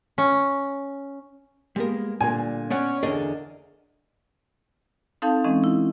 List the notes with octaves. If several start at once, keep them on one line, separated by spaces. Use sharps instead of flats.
C#4
G3 G#3 A#3 B3 A#4
A#2 D3 A#3 G#5
B3 C#4 D5 F#5
E2 D3 G#4 A#4 D5 D#5
C4 D#4 A4 F5 A5 G6
E3 G#3 C4 C#4 D#5
E4